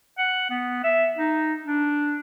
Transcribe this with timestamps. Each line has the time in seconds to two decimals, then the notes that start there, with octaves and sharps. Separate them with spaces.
0.18 F#5
0.50 B3
0.84 E5
1.17 D#4
1.64 D4